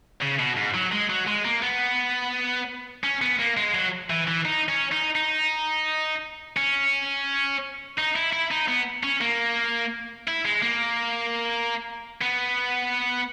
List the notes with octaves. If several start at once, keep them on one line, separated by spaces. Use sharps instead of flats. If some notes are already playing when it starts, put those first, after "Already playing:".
C#3
B2
G#2
F#3
G#3
F#3
G#3
A#3
B3
C#4
B3
A#3
G#3
F#3
E3
E3
D#4
C#4
D#4
D#4
C#4
D#4
E4
E4
D#4
B3
C#4
A#3
E4
G#3
A#3
B3